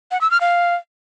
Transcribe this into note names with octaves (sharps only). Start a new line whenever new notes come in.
F#5
E6
F6
F5